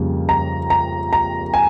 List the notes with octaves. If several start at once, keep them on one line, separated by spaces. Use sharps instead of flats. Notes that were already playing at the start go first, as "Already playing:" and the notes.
Already playing: F2 C#3 G3 A#3
A#5
A#5
A#5
G#5